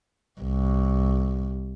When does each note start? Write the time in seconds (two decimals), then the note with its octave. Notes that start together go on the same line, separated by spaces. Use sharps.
0.41 C2